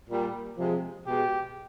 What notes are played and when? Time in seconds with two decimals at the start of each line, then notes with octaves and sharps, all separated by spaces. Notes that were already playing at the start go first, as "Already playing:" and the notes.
0.08 A#2 G3
0.57 C3 F3 G#3
1.05 B2 G#3 G4